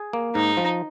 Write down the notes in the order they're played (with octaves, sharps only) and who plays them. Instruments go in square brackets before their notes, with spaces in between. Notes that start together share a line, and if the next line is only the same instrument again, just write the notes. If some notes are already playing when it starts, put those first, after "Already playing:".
Already playing: [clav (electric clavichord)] G#4
A#3
[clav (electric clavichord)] G#2 [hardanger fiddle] D#4
[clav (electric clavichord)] F3